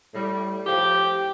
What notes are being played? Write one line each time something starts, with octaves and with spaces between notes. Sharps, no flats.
A2 G3
A2 F3 G4